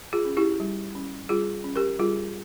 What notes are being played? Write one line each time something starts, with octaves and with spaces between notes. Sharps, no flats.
F4 G#4
C#4
E4 G4
G3
C#4
G3 F4 G#4
C#4
G4 A#4
G3 F4 G#4